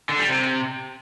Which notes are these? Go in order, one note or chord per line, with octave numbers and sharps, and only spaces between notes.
D3
G3
C3